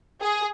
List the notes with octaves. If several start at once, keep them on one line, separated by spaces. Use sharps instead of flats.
G#4